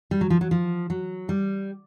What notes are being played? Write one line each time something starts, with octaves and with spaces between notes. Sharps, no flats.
G3
F#3
F3
F#3
F3
F#3
G3